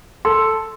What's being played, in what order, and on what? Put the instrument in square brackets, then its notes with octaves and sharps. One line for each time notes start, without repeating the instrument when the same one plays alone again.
[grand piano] A4 [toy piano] C6